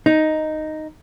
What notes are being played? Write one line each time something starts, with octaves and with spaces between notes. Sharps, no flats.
D#4